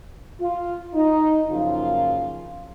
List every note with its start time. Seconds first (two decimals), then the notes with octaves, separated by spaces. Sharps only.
0.40 F4
0.94 D#4
1.49 F#2 C#3 F3 A#3 F4